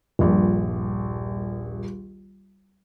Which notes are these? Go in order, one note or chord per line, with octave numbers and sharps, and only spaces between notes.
D#1 A#1 G2